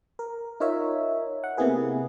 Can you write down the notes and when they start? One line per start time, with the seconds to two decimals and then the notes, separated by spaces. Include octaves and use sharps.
0.19 A#4
0.60 D#4 F4 A#4 C#5 E5
1.44 F#5
1.57 C3 A#3 B3 E4 G#4 B4